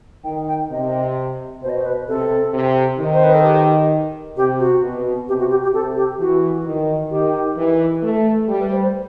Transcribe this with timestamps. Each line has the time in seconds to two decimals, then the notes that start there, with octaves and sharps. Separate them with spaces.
0.24 D#3 G5
0.47 G5
0.70 C3 D#5
1.62 B2 C5
1.69 D#5
1.78 C5
1.85 B4
2.08 C3 A4
2.54 C3
2.99 D#3
3.13 C5
3.24 B4
3.34 A4
3.44 G4
4.36 C3 G4
4.59 F#4
4.82 B2
5.27 C3 G4
5.39 F#4
5.50 G4
5.63 G4
5.73 C3 A4
5.96 G4
6.19 E3 F#4
6.65 D#3
7.10 D#3 G4
7.57 E3
8.02 A3
8.48 G3 G4
8.60 B4
8.70 C5
8.83 C5